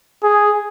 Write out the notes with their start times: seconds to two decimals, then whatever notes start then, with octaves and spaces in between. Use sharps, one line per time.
0.24 G#4